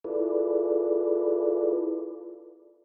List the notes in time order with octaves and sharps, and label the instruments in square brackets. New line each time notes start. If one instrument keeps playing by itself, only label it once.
[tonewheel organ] E4 F4 G#4 A4 B4 D5